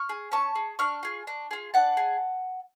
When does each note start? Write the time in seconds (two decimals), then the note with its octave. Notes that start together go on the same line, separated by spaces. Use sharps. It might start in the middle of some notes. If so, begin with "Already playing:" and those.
Already playing: C#6 F6
0.09 G#4
0.32 C#4 A5 C#6
0.55 G#4
0.79 D4 C#6 F6
1.03 F4 G#4
1.27 D4
1.51 F4 G#4
1.74 D4 F#5 A5
1.97 G#4